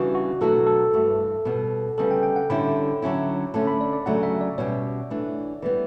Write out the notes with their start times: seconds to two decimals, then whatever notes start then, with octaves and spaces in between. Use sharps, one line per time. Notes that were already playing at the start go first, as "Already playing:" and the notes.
Already playing: C#3 E3 G3 D4 F#4
0.15 F#4
0.41 B2 F#3 A3 D4 F#4 A4
0.67 A4
0.93 G2 E3 A3
1.45 B2 G3 B3
1.98 D2 C#3 G3 B3 A4
2.11 G5
2.23 G5
2.36 F#5
2.50 D3 G3 C#4 E4 B5
3.02 D3 F#3 C#4 E4
3.54 D3 A3 C#4 A5
3.67 B5
3.81 D5
3.93 D5
4.06 D2 C#3 F#3 A3 D4 F#5
4.23 E5
4.41 D5
4.58 B2 G3 C#4 G4 C#5
5.10 E3 A3 D4
5.62 E3 G3 B3